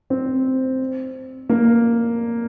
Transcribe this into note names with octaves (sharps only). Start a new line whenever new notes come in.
C4
A#3